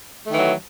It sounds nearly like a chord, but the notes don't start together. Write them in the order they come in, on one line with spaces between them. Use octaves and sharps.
A3 D#3 E3 F#3